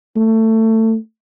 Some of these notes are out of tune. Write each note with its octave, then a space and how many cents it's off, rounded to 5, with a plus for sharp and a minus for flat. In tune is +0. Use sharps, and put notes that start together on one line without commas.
A3 +20